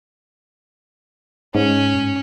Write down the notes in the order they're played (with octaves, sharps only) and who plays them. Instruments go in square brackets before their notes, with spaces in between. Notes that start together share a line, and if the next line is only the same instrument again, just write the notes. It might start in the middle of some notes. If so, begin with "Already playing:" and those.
[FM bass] G#2 [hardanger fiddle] C#4